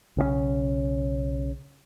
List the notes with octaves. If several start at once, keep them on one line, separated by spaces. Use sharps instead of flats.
B1 C#3 E3 C#4